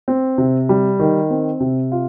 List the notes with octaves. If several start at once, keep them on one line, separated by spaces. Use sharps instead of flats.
C4
C3
G3
D#3
C4
C3
F4